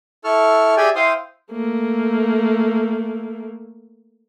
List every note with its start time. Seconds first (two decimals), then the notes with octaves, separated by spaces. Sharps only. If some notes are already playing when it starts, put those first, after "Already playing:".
0.24 E4 A4 C#6 F6
0.77 G4 G#4 D5 E5 G5 G#5
0.95 E4 C5 F5 G5 C6 D#6
1.51 A3 A#3